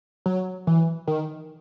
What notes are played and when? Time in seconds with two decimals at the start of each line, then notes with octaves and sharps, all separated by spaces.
0.26 F#3
0.67 E3
1.08 D#3